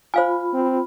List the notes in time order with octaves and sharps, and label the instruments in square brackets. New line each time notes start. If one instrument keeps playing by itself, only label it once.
[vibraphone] F4 B5 [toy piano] C5 F5 G#5
[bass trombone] C4